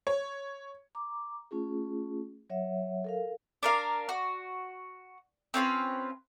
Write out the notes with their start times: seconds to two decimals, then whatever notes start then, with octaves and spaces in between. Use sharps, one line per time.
0.07 C#5
0.95 A#5 D6
1.51 A3 C#4 F4 G#4
2.50 F#3 C#5 E5 F#5
3.04 A4 A#4 F5
3.63 D4 A#4 F5
4.09 F#4
5.54 C4 C#4 F4 B4